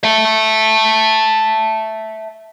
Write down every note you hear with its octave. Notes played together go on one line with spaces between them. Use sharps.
E5 A5